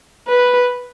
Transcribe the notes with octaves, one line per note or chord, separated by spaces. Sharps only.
B4